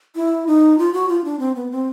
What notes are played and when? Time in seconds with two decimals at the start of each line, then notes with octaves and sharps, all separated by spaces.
0.16 E4
0.47 D#4
0.79 F4
0.93 F#4
1.09 F4
1.25 D4
1.39 C4
1.55 B3
1.71 C4